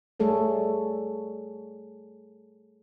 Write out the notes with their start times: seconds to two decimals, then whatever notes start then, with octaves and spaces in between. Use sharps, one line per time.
0.20 G3 A3 G#4 A4 C#5